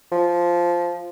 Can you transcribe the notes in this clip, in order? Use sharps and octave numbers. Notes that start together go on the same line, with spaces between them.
F3